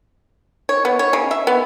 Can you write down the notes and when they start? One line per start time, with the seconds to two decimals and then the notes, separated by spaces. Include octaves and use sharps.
0.69 C#5
0.85 B3
0.99 C#5
1.13 C#3
1.31 E5
1.47 B3